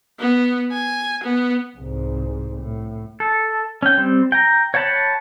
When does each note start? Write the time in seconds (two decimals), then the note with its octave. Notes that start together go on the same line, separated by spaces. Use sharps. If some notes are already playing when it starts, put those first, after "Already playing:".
0.19 B3
0.72 G#5
1.23 B3
1.78 C2 G#2
2.60 A2
3.20 A4
3.83 C#4 G5
3.97 G3 C4
4.32 G5 A#5
4.74 C#5 F#5 G5 A5 B5